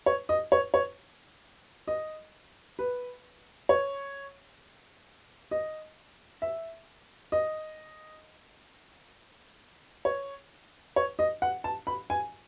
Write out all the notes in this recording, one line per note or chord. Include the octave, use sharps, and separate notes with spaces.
C#5
D#5
C#5
C#5
D#5
B4
C#5
D#5
E5
D#5
C#5
C#5
D#5
F#5
A5
B5
G#5